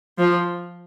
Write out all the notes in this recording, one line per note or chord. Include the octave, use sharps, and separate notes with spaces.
F3